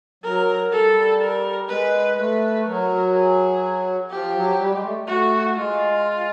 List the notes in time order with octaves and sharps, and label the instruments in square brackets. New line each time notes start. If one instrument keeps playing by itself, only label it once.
[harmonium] F#3 [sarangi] A#4
[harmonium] G3 [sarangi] A4
[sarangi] A#4
[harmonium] G#3 [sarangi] B4
[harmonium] A3 [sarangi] B4
[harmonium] F#3 [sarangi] A#4
[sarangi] G#4
[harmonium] F3 [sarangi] G4
[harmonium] F#3
G3
G#3
A3
[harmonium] A3 [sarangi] F#4
[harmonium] G#3 [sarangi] F4